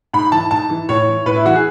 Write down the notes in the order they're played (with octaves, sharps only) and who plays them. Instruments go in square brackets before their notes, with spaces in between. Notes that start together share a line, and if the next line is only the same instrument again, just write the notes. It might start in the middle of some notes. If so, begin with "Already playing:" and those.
[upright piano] G#2 B5
E3 A5
G#2 A5
E3
A2 C#5
E3
A2 B4
E4
E3 F#4
G#4